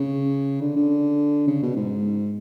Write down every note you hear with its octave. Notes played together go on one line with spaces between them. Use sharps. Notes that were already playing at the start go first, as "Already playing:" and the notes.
Already playing: C#3
D3
D3
C#3
B2
G#2